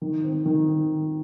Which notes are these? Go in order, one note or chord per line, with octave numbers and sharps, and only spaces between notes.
D#3
C4
D#3